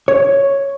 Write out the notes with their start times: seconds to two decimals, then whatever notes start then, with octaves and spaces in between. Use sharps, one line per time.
0.08 C#5